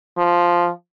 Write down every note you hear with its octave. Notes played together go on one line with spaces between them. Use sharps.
F3